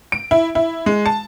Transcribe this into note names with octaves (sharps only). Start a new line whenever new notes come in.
D7
E4
E4
G#3
A5